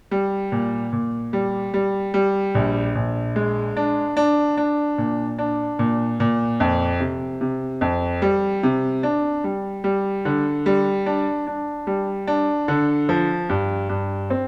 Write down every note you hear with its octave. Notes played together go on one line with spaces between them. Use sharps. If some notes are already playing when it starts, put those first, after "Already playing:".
G3
A#2
A#2
G3
G3
G3
A#1
A#1
G#3
D4
D4
D4
A#2
D4
A#2
A#2
F2
C3
C3
F2
G3
C3
D4
G3
G3
D3
G3
D4
D4
G3
D4
D3
F3
G2
G2
C4